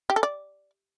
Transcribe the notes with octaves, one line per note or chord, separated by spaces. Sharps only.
G4
A4
D5